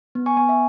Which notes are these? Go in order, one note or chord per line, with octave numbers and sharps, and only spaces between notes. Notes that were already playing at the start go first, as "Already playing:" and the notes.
B3
G#5 C#6
B3 G#5 C#6
E5 G#5